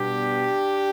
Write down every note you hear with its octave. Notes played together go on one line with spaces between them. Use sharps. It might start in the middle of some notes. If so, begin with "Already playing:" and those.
Already playing: B2 G3 B3 D4 G4